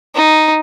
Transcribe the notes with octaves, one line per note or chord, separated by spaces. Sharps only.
D#4